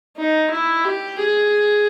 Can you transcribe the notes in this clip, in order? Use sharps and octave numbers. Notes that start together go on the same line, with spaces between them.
D#4
E4
G4
G#4